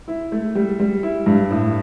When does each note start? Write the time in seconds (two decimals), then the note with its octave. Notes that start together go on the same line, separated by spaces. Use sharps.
0.08 E4
0.32 A3
0.55 G3
0.80 G3
1.03 E4
1.26 G2
1.51 A2